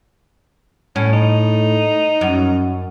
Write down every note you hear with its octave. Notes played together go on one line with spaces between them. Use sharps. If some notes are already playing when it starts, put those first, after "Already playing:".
A2 C#4
D#4
F#2